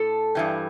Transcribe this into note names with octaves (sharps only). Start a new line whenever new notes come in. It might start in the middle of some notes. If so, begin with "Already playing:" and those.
Already playing: A2 A4
G2 E3 G3